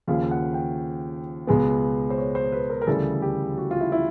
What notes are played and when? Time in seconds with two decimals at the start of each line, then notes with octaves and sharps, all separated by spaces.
0.07 D#2 C#3 F3 F5
0.31 F#5
0.54 G5
1.47 C#2 B2 G#3 B3
2.10 C5
2.18 C#5
2.35 C5
2.52 B4
2.70 A#4
2.82 A#4
2.87 D2 C#3 E3 G3 A4
3.22 G4
3.58 F#4
3.71 F4
3.81 E4
3.92 E4